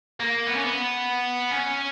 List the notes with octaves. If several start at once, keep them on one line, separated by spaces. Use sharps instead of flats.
A#3
B3
C#4
B3
C#4